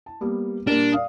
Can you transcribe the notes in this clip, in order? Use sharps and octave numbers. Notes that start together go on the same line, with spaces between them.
A5
G3 A#3 B3
A#2 G3 D4 A#4
D5 F5 D#6